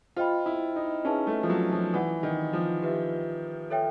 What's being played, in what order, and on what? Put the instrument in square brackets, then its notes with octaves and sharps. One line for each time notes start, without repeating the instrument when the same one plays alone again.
[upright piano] F4 [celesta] C5 D#5 G5 B5
[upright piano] E4
D#4
[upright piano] C#4 [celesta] D#4 G#4 B4 E5 A5
[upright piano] A3
F3
F#3
F3
[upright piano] E3 [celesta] B4 D5 F#5
[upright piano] D#3
F3
[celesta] G4 B4 E5
A4 C#5 E5 G5